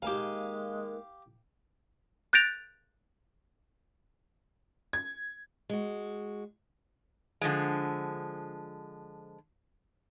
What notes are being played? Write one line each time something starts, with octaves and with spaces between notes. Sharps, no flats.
D#2 G#3 A#3 G4 F5 G#5
F#6 G6 A6 A#6 D7 F7
G#6
G#3 F#4
D3 F3 G#3